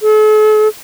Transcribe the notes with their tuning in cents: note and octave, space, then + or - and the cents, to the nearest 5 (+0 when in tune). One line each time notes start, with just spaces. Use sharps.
A4 -45